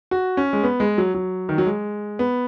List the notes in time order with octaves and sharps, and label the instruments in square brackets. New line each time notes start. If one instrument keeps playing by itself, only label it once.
[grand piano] F#4
C#4
G#3
B3
G#3
F#3
F#3
D#3
F#3
G#3
B3